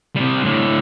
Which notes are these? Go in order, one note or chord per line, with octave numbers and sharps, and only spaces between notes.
C3 G3
A2 D3